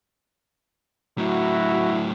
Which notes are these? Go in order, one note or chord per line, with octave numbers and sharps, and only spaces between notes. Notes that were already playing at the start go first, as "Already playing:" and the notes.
A2 F#3 E4 F#4